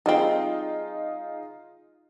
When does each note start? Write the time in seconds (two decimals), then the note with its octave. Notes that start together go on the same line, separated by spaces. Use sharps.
0.06 G3 C4 D#4 F4 G#4